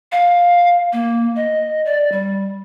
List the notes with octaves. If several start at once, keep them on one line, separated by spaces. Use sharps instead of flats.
F5
A#3
D#5
D5
G3